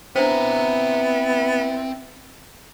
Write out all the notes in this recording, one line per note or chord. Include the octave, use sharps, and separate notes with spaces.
B3 C4 D4 E4 C5 A#5